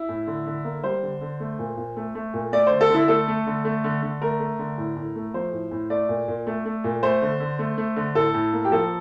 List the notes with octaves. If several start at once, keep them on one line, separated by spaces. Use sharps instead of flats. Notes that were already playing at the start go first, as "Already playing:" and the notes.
Already playing: E4
A2
D3
D3
A#3
G3 C5
D3
D3
A3
A#2
A#2
A3
A3
A#2
A3 D5
D3 C5
A4
D3 E4
A3 A4
A3
D3
A3
D3
D3
A3 A#4
A3
D3
A2
A2
A3
F3 C5
A2
A2
A3 D5
A#2
A#2
A3
A3
A#2
A3 C5
D3
D3
A3
A3
D3
A2 A4
A2
A#3
G4
F3 A4